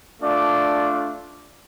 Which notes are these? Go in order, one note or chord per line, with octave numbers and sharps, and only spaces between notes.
A3 D4 F4 D5